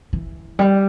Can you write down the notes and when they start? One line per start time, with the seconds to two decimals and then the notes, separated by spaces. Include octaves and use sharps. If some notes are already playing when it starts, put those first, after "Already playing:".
0.13 E3
0.59 G3